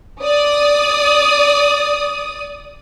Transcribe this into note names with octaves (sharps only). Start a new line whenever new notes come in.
D5 D#6